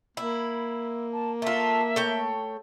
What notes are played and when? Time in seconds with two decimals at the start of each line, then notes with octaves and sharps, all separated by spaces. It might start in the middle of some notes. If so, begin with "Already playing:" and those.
0.17 A#3 E4 B5
1.13 A5
1.42 A3 F4 E5
1.96 A3 C#5 G5